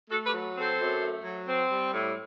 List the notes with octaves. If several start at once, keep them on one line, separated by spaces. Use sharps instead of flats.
A3 F#4 A4
G4 B4
F#3
C4
A4 C5
F#2
A3
F#3
C4
G3
A2